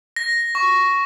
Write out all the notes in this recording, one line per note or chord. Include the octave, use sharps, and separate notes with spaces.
A#6
C#6